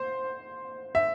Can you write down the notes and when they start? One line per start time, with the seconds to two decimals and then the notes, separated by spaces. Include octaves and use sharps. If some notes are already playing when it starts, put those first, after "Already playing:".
Already playing: C5
0.95 E5